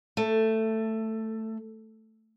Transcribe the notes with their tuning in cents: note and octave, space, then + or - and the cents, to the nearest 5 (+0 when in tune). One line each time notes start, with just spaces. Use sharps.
A3 +10